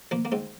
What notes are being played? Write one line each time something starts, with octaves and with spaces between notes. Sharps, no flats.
F3 A#3
A#3
G#2 C4